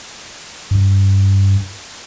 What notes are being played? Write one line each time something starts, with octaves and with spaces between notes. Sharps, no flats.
G2